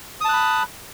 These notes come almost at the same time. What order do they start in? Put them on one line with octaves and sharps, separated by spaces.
D#6 A5 F#6 B5